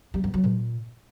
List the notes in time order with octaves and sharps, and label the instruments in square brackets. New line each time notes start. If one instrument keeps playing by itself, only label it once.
[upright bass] G3
G2
F#3
A#2